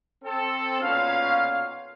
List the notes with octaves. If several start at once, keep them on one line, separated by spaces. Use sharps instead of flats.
C4 A4
B1 A#2 C#4 F4 F5